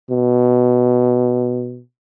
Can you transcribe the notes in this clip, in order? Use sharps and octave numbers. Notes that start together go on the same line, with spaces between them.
B2